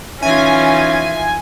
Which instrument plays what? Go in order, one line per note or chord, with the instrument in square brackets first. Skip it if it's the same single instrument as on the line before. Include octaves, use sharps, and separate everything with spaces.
[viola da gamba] E3 D#4 F4 [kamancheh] C#4 [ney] E5 [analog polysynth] G#5